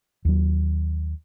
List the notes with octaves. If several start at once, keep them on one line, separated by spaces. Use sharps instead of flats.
D#2 F#3